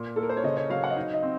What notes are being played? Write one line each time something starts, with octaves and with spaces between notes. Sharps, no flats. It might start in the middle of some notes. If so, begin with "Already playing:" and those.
Already playing: A#2
A#3 A4
A#4
C5
C#5
C#3 D#5
C#5
F#3 F5
F#5
D#5
D#4 F5
D#5
C4